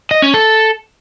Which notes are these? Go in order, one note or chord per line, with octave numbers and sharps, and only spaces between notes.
D#5
C#4
A4